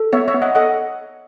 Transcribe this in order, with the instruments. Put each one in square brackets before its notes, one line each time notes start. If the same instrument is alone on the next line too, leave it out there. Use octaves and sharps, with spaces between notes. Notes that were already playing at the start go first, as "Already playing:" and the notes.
Already playing: [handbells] A4
[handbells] B3 [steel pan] C#5 E5
[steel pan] C#5 E5
[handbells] B3
[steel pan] D#5 F#5
[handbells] A4 [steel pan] D#5 F#5